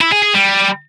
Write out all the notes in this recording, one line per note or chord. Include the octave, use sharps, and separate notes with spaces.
E4
G#4
G#4
G3